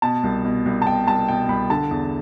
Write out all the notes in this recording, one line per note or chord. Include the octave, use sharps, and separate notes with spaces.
B2 A5
C2
B2
C2
A5
B2 G5
C2 A5
B2 G5
C2 B5
D3 A5
E2